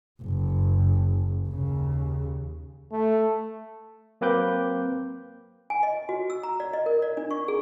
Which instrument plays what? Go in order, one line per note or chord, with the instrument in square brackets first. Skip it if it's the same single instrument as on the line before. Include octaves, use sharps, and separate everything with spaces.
[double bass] F#1
D#2 C#3
[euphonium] A3
[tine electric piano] F#3 A#3 C4 B4 D6 G6
[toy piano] G#5
D#5
F#4
E6
A#5
D5
D#5
A#4
D5
D4
C#6
G#4